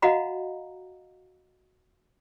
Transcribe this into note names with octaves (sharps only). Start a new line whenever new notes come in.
F#4 D#5 F5 F#5 A#5 B5